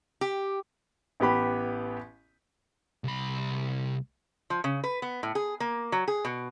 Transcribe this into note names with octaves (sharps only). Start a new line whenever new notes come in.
G4
A1 B3 G4 B5
C2 B5
F3
C#3
B4
B3
A2
G#4
A#3
F#3
G#4
B2